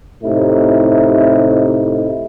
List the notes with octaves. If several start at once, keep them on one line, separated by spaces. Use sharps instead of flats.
A2 C3 D#4 E4